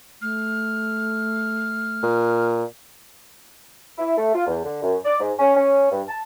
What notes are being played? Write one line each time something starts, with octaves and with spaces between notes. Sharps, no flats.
A3 F6
A#2
E4
A3
F4
E2
D3
F#2
D5
G#2
C#4
C#4
G2
A5